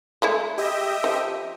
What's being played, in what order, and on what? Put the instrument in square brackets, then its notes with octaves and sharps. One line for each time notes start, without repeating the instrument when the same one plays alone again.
[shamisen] G#3 A3 E4
[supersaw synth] G4 D#5 E5
[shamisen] F3